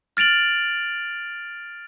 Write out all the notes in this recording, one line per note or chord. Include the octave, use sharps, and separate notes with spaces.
F6 A6 D7 F7 F#7